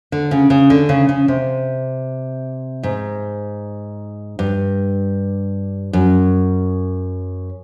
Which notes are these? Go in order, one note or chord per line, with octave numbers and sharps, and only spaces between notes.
D3
C#3
C#3
D3
C#3
C#3
C3
G#2
G2
F#2